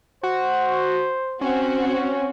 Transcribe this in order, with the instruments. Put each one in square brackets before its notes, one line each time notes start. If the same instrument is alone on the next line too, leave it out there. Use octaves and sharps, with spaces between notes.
[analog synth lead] F#4 [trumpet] C5
[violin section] C4 F#4 [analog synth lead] C#4